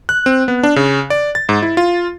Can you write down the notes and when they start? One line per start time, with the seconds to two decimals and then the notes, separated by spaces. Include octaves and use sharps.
0.09 F#6
0.26 C4
0.48 B3
0.63 D4
0.76 C#3
1.10 D5
1.35 A6
1.49 G#2
1.62 E4
1.77 F4